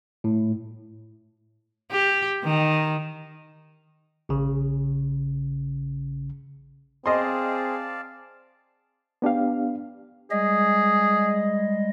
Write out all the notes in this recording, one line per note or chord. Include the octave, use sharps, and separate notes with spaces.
A2
G4
D#3
A1 C#3
C4 G#4 D5 D#5 F5 A5 C6
B3 D4 G4 F5
G3 G#3 G#4 D#5